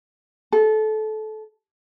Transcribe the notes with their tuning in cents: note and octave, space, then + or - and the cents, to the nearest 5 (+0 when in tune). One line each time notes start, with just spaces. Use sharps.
A4 -25